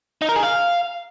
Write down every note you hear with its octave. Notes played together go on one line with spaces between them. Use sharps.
D#4
A#4
G#4
F5